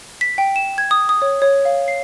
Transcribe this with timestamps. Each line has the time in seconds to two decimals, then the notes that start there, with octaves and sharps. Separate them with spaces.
0.21 B6
0.38 G5
0.56 E7
0.78 G#6
0.91 D#6
1.09 D#6
1.22 C#5
1.42 C#5
1.65 F5
1.88 C7